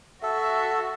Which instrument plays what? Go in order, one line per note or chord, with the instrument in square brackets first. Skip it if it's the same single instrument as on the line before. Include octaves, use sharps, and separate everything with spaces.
[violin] F#4 [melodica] A4 [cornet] E5